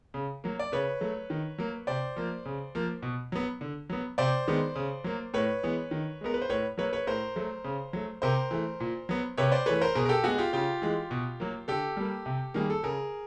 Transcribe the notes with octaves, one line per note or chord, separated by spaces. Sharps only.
C#3
F#3 A#3
D5
C#3 B4 C#5
F#3 A3
D#3
F#3 A#3
C3 C5 D5
F3 A#3
C#3
F3 A#3
B2
F#3 B3
D3
F#3 B3
C3 C5 D5
D#3 G#3 B3
C#3
F#3 A#3
A2 B4 C#5
E3 G#3 B3
D#3
G#3 B3 A#4
B4
C5
A2 B4 C#5
F#3 A#3 B4 C#5
B4 C#5
A2 A#4 C5
F#3 A3
C#3
F#3 A3
C3 A#4 C5
E3 A3
A#2
F#3 B3
C3 B4 C#5
C5 D5
E3 A3 B4 C#5
A#4 C5
B2 G#4 A#4
A#4
G4 A4
G#3 B3 F#4 G#4
F4 G4
C#3 F4 G4
E3 G#3
B2
F#3 A#3
D3 G4 A4
G3 A#3
C3
D#3 G3 A#3 G#4
A4
C#3 G#4 A#4